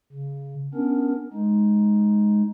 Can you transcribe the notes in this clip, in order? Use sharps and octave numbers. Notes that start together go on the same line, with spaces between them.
C#3
B3 C#4 D4 A#4
G#3 D#4